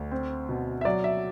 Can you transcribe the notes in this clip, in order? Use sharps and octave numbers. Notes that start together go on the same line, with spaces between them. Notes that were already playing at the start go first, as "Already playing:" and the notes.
Already playing: D2
C4
B2
E5
F#3 D5
E5